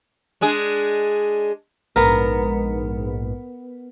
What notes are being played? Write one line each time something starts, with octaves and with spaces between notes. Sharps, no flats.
G#3 D4 G#4
A#1 G#2 B3 A#4